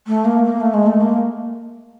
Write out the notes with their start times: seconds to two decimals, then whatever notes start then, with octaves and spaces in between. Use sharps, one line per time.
0.07 A3
0.25 A#3
0.44 A#3
0.60 A3
0.74 G#3
0.87 A3
1.01 A#3